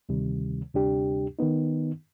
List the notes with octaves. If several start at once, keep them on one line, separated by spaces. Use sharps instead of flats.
D2 C3 D#3 G3
D2 C3 G3 D4 G4
D#3 B3 D#4